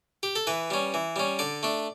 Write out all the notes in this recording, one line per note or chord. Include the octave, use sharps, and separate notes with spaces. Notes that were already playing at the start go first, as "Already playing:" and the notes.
G4
A4
E3 B4
G3 C#4
E3
G3 C#4
D3 D5
A3 D4